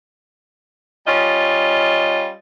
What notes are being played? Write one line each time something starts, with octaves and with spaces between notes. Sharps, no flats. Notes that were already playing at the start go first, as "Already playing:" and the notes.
G3 C#4 F4 D#5